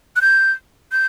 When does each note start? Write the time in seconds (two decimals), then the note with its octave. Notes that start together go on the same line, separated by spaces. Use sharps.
0.16 F#6
0.21 G6
0.92 G6